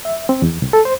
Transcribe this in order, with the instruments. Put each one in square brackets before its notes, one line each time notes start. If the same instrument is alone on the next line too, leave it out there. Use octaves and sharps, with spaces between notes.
[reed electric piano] E5
C4
E2
C2
A4
C5